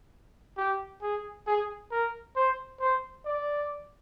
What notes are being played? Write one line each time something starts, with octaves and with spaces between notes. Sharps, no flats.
G4
G#4
G#4
A#4
C5
C5
D5